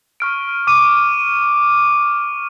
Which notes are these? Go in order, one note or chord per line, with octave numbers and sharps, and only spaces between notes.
C#6 F6 D7
D6 D#7